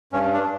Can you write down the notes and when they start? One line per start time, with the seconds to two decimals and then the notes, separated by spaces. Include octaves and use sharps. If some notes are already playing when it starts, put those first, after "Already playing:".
0.13 G2 C#4
0.33 D4